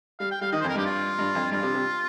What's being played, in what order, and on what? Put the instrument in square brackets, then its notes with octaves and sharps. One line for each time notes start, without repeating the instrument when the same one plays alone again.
[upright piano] G3 [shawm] F5
[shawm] G5
[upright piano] G3 [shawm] F5
[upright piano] D#3 [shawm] D#5
[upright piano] F2 [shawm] C5
[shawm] A#4
[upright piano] G2 [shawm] G4
[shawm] F4
[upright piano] G2
F2
[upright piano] G2 [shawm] F4
[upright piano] C3
C3